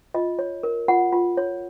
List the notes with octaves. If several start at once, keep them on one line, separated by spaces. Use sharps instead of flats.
F4 D#5
C#5
A#4
F4 F#5
F4
C#5